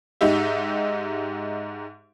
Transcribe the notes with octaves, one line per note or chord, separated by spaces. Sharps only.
G#2 D#4 G4 E5